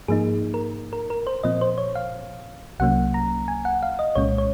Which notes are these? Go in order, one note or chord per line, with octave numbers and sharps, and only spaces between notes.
G#2 F3 A#3 D#4 G#4
A#4
A#4
A#4
C5
A#2 F3 C4 D#5
C5
C#5
F5
C2 C3 F#3 A#3 C#4 F#5
A#5
G#5
F#5
F5
D#5
C2 A#2 G#3 C#4 C#5
C#5